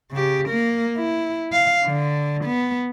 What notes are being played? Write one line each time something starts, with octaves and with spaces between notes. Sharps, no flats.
C#3 G4
A#3 A#4
E4
F5
D3
B3